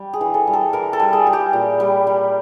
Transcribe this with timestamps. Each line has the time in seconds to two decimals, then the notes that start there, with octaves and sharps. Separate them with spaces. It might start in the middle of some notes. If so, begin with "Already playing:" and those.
Already playing: G3
0.13 G#4
0.21 E3
0.34 A4
0.47 G3
0.53 A4
0.73 E3 A#4
0.93 A4
1.00 G3
1.13 G#4
1.27 G3
1.33 G4
1.53 A#2
1.80 G3
2.07 G3